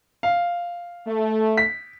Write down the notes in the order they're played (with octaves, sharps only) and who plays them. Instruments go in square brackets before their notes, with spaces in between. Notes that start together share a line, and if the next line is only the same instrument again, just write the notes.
[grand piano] F5
[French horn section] A3
[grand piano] B6